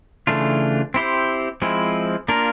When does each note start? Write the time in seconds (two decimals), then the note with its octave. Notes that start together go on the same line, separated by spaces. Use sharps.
0.27 C#3 E3 A3 D4 F4
0.94 C4 E4 G4 C5
1.62 F3 G#3 C4 E4
2.28 A#3 D4 F4 A#4